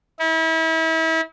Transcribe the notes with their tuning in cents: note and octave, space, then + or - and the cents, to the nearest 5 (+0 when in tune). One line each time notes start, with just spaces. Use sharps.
E4 -35